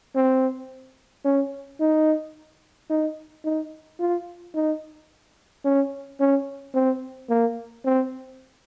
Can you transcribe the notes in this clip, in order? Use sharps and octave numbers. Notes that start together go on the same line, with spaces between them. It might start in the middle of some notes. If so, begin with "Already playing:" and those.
C4
C#4
D#4
D#4
D#4
F4
D#4
C#4
C#4
C4
A#3
C4